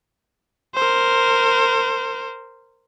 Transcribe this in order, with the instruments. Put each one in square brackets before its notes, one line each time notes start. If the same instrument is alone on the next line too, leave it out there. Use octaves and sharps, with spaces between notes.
[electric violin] A#4 C5